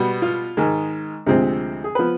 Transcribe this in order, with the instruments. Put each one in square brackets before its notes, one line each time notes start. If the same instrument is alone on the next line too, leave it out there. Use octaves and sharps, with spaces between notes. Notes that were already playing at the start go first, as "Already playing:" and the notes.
Already playing: [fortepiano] B2 G3 B3
F4
G#2 D#3 G#3
D2 C3 F3 G#3 C4
G#4
F3 B3 B4